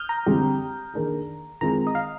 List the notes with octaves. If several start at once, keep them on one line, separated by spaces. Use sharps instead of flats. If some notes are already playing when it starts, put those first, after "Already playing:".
Already playing: D#6 F6 G6
A#5
D3 G3 C4 G4
D#3 A#3 D4 G#4
D#3 G#3 C4 F4 A#5
D#5
F5